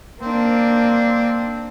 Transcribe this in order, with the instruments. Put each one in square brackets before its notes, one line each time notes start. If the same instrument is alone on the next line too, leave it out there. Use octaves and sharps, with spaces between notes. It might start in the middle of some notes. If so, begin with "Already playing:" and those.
[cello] A#3 D4 [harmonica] C4